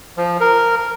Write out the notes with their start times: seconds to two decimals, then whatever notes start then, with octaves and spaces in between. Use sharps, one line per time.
0.17 F3
0.40 A#4